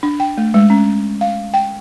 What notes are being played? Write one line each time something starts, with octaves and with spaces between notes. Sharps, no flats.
D4
G5
A3
G#3
C#4
F5
G5